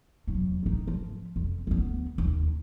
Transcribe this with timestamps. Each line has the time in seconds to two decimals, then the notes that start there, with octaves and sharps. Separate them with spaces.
0.27 E2 F#3
0.63 G#2 D#4
0.88 F3
1.36 F2
1.67 D2 B3
2.18 D#2